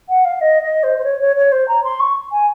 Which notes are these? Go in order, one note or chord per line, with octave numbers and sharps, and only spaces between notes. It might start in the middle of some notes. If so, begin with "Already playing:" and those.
F#5
F5
D#5
D#5
C5
C5
C#5
C#5
C#5
C5
A#5
C6
C#6
G#5